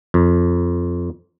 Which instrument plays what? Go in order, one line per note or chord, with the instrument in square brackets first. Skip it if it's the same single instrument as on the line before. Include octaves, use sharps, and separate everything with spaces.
[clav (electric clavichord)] F2